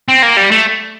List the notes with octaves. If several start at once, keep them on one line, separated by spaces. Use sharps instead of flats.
C4
A#3
G3
A3